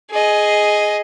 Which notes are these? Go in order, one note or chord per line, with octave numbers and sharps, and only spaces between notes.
G#4 D#5